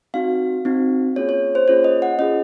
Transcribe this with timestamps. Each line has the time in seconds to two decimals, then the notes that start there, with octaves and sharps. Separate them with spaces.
0.14 C4 D#4 F#4 F5
0.65 C4 D#4 F#4
1.16 A#3 C#4 F4 G#4 C#5
1.29 C#5
1.55 C5
1.68 A#3 C#4 F4 G#4 C#5
1.84 D#5
2.02 F#5
2.19 C#4 F4 G#4 D#5